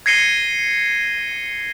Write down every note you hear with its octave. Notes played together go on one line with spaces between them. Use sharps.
G#6 A#6 C7 C#7 D#7 G7